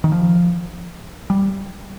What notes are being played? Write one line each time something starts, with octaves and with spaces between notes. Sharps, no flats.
D#3
F3
G3